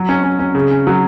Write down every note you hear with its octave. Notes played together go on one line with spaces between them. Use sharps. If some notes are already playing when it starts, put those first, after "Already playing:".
Already playing: F#3
C#4
C#4
C#4
C#3
C#4
F#3